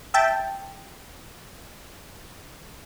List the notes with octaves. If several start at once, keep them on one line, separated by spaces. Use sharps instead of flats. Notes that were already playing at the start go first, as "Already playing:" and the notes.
E5 G5 A5